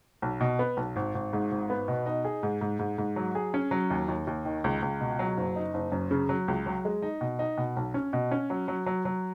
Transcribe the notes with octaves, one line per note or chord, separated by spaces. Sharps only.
B1
B2
B3
B1
G#1
G#1
G#2
G#1
B3
B2
D#4
G#4
G#2
G#2
G#2
G#2
F#3
G#4
C#4
F#3
D#2
D#2
D#2
D#3
C#2
C#2
B2
F#3
F#1
D#4
F#1
F#2
C#3
F#3
C#2
F#3
G#3
D#4
B2
D#4
B2
B1
C#4
B2
C#4
F#3
F#3
F#3
F#3